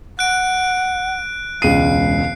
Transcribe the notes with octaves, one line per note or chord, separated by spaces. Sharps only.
F#5 F#6 D7
E1 C#2 F5 C7 D#7